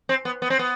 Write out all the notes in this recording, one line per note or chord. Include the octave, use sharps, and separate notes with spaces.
C4
B3
B3
C4
B3